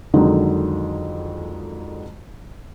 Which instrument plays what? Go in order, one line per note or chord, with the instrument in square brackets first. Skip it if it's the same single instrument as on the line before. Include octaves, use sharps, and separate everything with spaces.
[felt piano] F2 D3 D#3 F#3 G#3 D#4